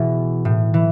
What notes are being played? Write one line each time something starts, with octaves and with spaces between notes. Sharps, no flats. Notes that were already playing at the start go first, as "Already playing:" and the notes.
Already playing: B2 E3 G#4
A2
E3